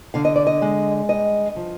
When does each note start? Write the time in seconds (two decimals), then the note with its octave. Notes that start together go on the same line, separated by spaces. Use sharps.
0.14 D3 F5
0.25 D#5
0.36 D5
0.47 D#5
0.62 G#3
1.09 G2 D#5
1.56 F3